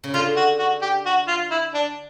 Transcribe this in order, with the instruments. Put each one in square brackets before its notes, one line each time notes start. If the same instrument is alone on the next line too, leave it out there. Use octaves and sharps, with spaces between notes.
[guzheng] C#3
[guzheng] D3 [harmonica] F4
[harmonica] F#4
F#4
G4
F#4
F4
E4
D4